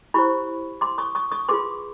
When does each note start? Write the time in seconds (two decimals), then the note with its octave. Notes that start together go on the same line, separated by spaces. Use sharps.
0.14 E4 G4 C5 B5 C#6
0.81 C6 D6
0.98 C#6 D#6
1.15 C#6 D#6
1.31 C#6 D#6
1.48 F4 G#4 B4 C6 D6